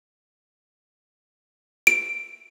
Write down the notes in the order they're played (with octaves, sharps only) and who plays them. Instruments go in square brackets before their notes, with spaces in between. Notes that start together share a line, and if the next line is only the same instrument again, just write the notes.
[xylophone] D7